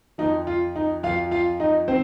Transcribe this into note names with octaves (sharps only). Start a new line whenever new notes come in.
F2 F3 D#4
F4
D#4
F2 F3 F4 F5
F4 F5
D#4 D#5
D#3 C4 C5